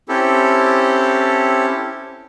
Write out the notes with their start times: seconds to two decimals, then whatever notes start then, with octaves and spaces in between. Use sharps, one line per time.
0.09 C4 C#4 E4 G4 A4